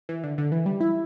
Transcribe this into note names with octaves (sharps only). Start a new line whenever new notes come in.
E3
D3
D3
E3
G3
E4